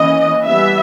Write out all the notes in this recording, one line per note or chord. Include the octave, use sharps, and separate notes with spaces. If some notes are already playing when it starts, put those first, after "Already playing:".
Already playing: E3 A#3 C#4 D#5
E3 G3 B3 E5